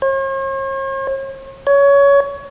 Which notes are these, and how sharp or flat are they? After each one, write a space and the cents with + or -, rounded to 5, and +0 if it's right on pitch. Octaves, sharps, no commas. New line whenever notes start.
C#5 -45
C#5 +20